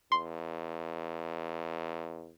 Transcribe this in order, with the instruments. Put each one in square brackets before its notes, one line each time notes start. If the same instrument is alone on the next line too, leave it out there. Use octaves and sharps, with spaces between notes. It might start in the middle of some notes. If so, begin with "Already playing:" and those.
[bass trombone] E2 [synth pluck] C6